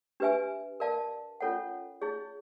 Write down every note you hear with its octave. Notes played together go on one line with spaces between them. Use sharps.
D4 G4 B4 E5 G#5
A#4 D5 F5 A5
C#4 F4 A4 C#5 F#5
D#4 G#4 C#5